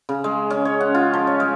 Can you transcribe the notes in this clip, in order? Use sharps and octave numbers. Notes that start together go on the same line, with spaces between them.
C#3
G#3
C#4
C#5
F#5
F4
F3
C#5
G#3